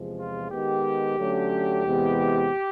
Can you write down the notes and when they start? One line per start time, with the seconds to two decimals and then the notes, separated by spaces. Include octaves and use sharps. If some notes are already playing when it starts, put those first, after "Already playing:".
Already playing: E2 C3 F3 G#3
0.18 F4
0.51 D#3 G#3 B3 G4
1.17 D3 F#3 A3 C#4
1.84 E2 C3 E3 G#3 B3